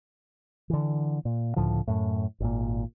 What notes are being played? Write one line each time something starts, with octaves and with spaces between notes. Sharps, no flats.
D3 E3
A#2
C#2 A2 D3 F3
F#2 A2
G#1 A#2